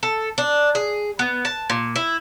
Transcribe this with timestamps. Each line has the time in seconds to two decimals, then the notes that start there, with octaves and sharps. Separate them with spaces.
0.03 A4
0.38 D4
0.75 G#4
1.19 B3
1.45 A5
1.70 A#2
1.96 E4